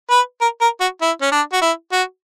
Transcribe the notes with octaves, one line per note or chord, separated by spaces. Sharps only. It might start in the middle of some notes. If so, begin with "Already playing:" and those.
B4
A#4
A#4
F#4
E4
C#4
D4
F#4
E4
F#4